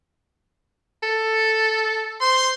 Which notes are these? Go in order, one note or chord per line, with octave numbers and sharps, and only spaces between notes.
A4
C5 C6